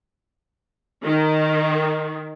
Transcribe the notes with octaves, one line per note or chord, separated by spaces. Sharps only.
D#3